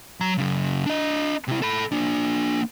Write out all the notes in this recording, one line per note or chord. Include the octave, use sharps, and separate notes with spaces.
F#3 A#5
F#2 C#3
D4 D#5
C3 E4
A4 B5
A#3 D4